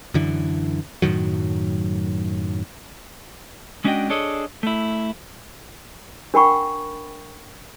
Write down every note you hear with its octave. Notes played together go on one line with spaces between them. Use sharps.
F#2 D3 E3
F#2 A2 D#3 F#3
G#3 C#4 D4 F#4 D#5 G5
D4 G#4 A4 C#5 D#5
A3 E4
D4 A#4 F#5 G5 B5 C#6